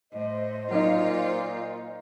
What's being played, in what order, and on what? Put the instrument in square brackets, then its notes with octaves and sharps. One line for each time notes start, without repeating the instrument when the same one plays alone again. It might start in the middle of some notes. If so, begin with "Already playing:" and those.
[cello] A2 [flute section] C5 D#5
[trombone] A#2 [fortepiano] F#3 A#3 D#4 [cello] F4